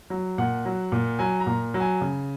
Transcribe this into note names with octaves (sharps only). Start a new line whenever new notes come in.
F#3
A#2 F#5
F#3
A#2
F#3 G#5
A#5
A#2
F#3
G#5
C#3